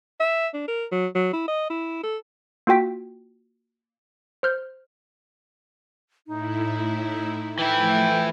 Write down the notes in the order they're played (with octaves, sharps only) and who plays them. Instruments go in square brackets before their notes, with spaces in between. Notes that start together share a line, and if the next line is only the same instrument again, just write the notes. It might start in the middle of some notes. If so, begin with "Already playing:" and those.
[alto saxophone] E5
D4
A#4
F#3
F#3
E4
D#5
E4
A4
[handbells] A#3 F4 F#4 G5 B6
C5 F6 G6
[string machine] A2 E4 [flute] D#4
[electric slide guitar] E3 E4 [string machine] F3 A3 [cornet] G5